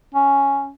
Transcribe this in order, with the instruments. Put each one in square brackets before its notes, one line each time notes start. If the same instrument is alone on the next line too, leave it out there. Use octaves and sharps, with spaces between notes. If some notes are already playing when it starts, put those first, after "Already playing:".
[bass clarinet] C#4